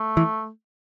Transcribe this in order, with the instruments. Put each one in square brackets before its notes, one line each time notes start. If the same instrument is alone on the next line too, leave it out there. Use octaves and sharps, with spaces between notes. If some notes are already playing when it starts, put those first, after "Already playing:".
Already playing: [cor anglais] A3
[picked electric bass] E3